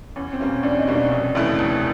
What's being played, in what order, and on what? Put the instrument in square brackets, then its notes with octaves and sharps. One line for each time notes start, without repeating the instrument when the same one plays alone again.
[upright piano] E2 [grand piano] C#4
[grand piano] C4
[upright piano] B2 G3 A#3 [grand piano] C#4
[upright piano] E2 [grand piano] D4
[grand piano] D#4
[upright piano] B2 G3 A#3
[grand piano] D4
[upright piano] F1
D#2 C#3 E3 A3
F1